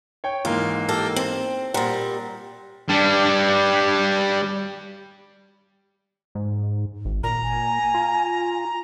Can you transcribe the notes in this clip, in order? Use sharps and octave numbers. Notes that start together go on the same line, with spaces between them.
C#5 G5
G#2 E3 A#3 F4
G4 A4 A#4
C4
A#2 G3 F#5 A#5 C6
G3 D4
G#2
G#1
A#2 A#5
G#5
F4